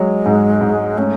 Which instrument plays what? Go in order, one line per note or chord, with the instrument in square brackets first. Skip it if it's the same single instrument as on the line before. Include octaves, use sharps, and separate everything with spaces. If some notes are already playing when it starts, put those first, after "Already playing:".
Already playing: [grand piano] F#3 [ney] G#3
[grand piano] G#2
G#2
[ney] A3 [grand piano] C#4